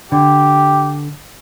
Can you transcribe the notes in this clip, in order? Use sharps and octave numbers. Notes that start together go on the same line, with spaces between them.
D3 G4